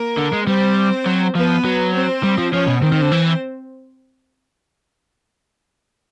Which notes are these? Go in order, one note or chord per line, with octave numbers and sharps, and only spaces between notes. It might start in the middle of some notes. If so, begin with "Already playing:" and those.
Already playing: A#3 A#4
D3
G#3
G3 C4 C5
F#3
F3 B3 B4
F#3
C4 C5
G3
F3
F3 C#4 C#5
B2
D#3 C4 C5
D#3
D3
E3